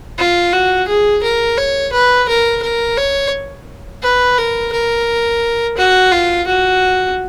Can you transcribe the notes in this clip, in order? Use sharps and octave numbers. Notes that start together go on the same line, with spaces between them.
F4
F#4
G#4
A#4
C#5
B4
A#4
A#4
C#5
B4
A#4
A#4
F#4
F4
F#4